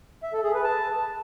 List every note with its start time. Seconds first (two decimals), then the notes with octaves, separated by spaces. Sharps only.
0.23 E5
0.33 A4
0.43 G#4
0.54 B4
0.64 A5